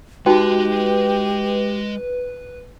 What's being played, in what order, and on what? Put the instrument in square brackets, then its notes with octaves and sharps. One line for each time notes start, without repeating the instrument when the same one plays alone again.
[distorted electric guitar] G#3 C6 [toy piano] D#4 F#4 G5 [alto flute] G4 [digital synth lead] B4